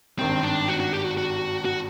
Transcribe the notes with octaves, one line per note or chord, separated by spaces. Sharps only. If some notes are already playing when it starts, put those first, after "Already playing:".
G#1 G2 D#3 G3 C4
D4
F#4
F#4
G4
F#4
F#4
F#4